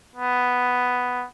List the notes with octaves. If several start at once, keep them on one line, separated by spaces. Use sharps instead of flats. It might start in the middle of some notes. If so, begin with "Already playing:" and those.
B3